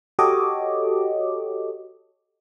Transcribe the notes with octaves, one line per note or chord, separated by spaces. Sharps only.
F#4 G4 A4 C#5 D#5 D6